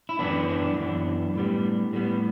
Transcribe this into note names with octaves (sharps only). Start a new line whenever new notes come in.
E4
F#2 E3 B3 D4
D4
F#2 E3 B3
A2 G3 B3
A2 G3 B3